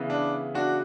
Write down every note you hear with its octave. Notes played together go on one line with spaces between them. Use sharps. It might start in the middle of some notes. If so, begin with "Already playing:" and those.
Already playing: C#3 E3 B3
D4
D4 F#4